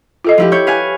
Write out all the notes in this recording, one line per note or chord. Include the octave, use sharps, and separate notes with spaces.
F4 A4 D#5
F3 E4 G4
E4 C#5 G6
B4 F5 G#5